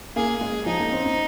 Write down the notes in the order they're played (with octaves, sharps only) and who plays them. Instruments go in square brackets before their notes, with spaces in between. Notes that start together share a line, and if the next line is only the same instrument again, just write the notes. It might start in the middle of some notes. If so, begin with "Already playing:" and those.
[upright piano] A#3 [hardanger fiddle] G#4
[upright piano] G#3
[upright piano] F3 [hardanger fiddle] D#4
[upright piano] A#3
C4
C4